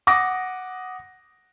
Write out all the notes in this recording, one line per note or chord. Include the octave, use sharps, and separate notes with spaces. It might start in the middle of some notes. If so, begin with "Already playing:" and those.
F#5 D6 D#6 A#6